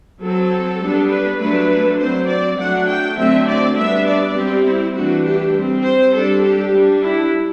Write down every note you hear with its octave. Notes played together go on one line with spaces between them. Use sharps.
F#3 C4 A4
G3 B3 D4
B4
F#3 A3 D4 B4
F#3 C4 C5
D5
F#3 A3 D4 F#5
G5
D3 F#3 A3 C4 E5
D5
G3 B3 D4 E5
D5
G3 C4 G4
E4
E3 A3 D4 F#4
G4
G3 C4
C5
G3 D4 A4
G4
G3 D4
E4